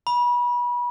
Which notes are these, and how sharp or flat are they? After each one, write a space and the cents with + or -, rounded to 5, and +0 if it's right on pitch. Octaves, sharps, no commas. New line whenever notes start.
B5 -30